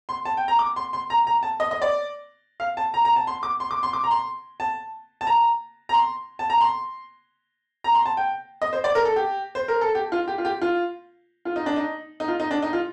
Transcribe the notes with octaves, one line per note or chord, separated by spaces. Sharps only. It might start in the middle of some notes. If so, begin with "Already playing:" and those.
C6
A5
G5
A#5
D6
C6
C6
A#5
A#5
A5
D#5
D#5
D5
F5
A5
A#5
A#5
A5
C6
D6
C6
D6
C6
D6
A#5
C6
A5
A5
A#5
A#5
C6
A5
A#5
C6
A#5
C6
A5
G5
D#5
C5
D5
A#4
A4
G4
C5
A#4
A4
G4
F4
G4
F4
G4
F4
F4
D#4
D4
D#4
D#4
F4
D#4
D4
D#4
F4